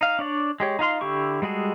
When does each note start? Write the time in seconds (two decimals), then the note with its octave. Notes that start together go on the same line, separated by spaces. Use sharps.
0.01 D#4 F5
0.19 D4 C#5 D5
0.60 G#3 G4 C#5
0.79 D#4 F4 F5 C6
1.01 D3 E4 G4 C#6
1.42 G3 G#3 F#4 G#4 A4